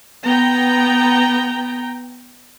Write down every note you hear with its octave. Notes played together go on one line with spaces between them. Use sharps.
B3 G5 A#5